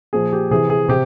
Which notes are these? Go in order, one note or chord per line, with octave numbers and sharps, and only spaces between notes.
A#2 F3 G#4
G4
C3 E3 G#4
G#4
C3 G4